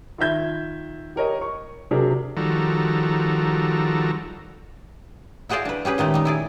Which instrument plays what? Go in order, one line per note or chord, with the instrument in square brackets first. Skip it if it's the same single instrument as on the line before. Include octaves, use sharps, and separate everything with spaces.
[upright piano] D#3 F4 E5 G6 G#6
G4 A#4 C#5 D#5
C#6
C3 F#3 D4 G#4 A#4
[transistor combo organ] D#3 F3 G3 F#4 A4 A#5
[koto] E4 F#4 G#4 C5 D5 F5
D4 B4
C#4 G4 G#4 B4
A#2 D#3 G#3 A3 G4
G3 D#4
E4 G#4 D5